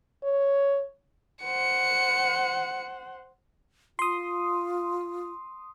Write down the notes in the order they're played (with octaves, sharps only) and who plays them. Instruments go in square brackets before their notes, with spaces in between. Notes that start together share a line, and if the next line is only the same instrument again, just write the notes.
[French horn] C#5
[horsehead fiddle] C5 F#5 [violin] C#7
[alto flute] F4 [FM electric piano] C6 D#6